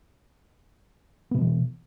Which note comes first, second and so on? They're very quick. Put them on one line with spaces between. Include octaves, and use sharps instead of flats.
B3 B2 F#3 E3